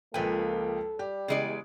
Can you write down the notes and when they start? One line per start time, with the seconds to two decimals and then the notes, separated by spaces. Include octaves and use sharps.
0.14 C#2 F3 A#3 A4 B4 G5 G#5
0.99 G3 G4
1.28 E2 C#3 G#3 D5